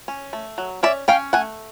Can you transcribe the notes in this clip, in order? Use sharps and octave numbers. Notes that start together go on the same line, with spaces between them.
C#4
A3
F#3
C#4 D5 E5
C#4 F5 G5
A3 F#5 G#5